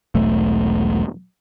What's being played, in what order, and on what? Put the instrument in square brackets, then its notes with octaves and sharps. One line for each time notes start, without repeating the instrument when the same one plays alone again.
[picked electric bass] E1 B1 A3